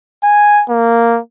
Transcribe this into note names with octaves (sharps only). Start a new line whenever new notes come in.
G#5
A#3